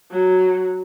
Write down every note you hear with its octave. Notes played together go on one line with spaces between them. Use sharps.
F#3